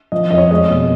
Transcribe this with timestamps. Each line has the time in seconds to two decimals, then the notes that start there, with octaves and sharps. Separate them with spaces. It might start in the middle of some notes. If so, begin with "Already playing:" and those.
0.12 F3 D#5
0.30 F2 D#5
0.38 C#5
0.51 G#3 D#5
0.70 B2